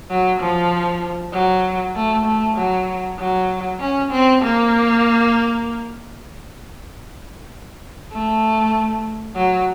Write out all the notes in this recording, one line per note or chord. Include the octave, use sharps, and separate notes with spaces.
F#3
F3
F#3
A3
A3
F#3
F#3
C#4
C4
A#3
A3
F#3